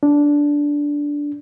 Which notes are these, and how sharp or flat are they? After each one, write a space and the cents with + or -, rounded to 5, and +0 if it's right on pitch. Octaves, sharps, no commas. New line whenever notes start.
D4 -10